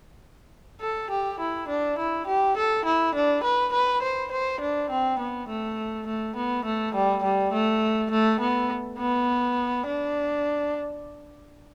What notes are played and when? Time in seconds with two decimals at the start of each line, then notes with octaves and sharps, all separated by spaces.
0.81 A4
1.10 G4
1.40 E4
1.69 D4
1.98 E4
2.27 G4
2.57 A4
2.85 E4
3.15 D4
3.43 B4
3.73 B4
4.02 C5
4.31 C5
4.60 D4
4.90 C4
5.19 B3
5.48 A3
6.07 A3
6.36 B3
6.65 A3
6.94 G3
7.23 G3
7.53 A3
8.11 A3
8.40 B3
8.98 B3
9.86 D4